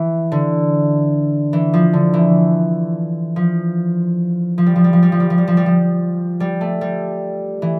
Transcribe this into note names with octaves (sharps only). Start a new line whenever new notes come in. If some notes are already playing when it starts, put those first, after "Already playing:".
Already playing: E3
D3
E3
F3
D3
E3
F3
F3
G3
F3
G3
F3
G3
F3
G3
F3
G3
F3
G3
F3
G3
A3
G3
E3